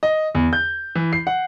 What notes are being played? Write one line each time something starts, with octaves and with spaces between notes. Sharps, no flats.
D#5
E2
G6
E3
C7
F#5